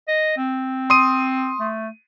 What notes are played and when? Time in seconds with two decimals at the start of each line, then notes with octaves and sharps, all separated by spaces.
0.08 D#5
0.37 C4
0.90 C6 D#6 D#7
1.60 A3